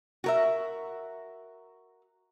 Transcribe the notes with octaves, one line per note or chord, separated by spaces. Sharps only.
F#4 A#4 E5